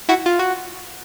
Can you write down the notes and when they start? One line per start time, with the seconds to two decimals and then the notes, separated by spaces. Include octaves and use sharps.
0.09 E4 F#4
0.26 F4
0.39 F#4